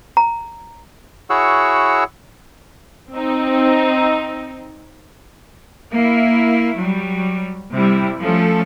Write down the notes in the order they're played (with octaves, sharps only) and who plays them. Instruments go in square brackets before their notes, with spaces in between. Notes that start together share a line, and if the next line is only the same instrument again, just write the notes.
[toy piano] A#5
[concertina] E4 F#4 G#4 C#5 F#5 E6
[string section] C4 D#4
[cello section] A#3 E4
F#3 G3
C3 G3 E4
F3 A3 C#4 A4